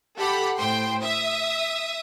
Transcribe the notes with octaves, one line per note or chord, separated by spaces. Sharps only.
G4 A4 F#5 B5
A2 C5 G5 C6
E5 D#6